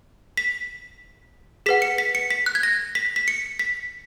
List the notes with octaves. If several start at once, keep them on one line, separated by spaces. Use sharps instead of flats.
B6
G#4 B4 F#5 B6
C#7
B6
C#7
B6
F#6
G#6
A#6
B6
B6
C#7
B6